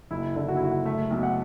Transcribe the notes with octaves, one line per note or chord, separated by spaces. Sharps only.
F#1 E4
D3
F#4
E4
F#1 F#4
A3 E5
B1
F#5